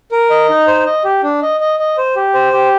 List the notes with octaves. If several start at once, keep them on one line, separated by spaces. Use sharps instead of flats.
A#4
D#5
D#4
C5
D#5
G4
D4
D#5
D#5
D#5
C5
G4
C5
G4